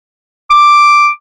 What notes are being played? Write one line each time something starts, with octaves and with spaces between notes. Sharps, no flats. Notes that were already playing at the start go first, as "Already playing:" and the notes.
D6